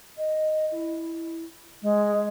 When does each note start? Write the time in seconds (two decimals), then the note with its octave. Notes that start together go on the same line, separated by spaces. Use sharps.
0.17 D#5
0.71 E4
1.82 G#3